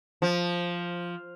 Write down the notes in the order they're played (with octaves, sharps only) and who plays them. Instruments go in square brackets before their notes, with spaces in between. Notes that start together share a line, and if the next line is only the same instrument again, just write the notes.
[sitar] F3